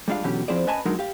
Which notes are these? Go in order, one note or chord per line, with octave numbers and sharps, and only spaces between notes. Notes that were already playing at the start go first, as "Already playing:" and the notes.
G3 G#3 D4 F4 F5
B2 D3 E3 F#3 C#4 G4
F3 C4 E4 G#4 C5 D5
C#4 B4 D#5 G#5 A5 B5
F#3 G#3 D4 D#4 A#4
G4 F5